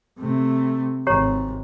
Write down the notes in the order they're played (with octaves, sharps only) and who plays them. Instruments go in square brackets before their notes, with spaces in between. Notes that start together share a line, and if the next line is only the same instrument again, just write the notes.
[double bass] C3 A3
[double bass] G#1 G#2 [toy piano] G4 C#5 A#5